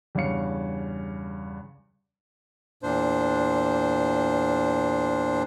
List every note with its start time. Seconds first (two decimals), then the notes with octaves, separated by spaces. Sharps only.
0.15 E2 G2 C#3 C#5 F5 C#7
2.83 E2 A#2 D4 C5